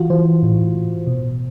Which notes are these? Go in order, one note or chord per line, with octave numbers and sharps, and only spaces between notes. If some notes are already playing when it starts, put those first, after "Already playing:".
Already playing: E3 F4 F#4
E3 C5
A2
A2
B2